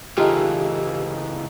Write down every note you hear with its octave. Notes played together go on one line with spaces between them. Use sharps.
C#2 E3 A3 D#4 F4 G4 G#4